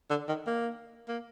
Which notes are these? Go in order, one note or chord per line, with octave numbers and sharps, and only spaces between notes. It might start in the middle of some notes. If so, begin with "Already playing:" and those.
D3
D#3
A#3
A#3